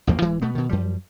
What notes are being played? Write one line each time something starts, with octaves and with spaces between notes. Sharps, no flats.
A1 E2 F3 A#3
D1 E3 G#3
B2 A3 B3
B2 D#3
F#2 F3 G3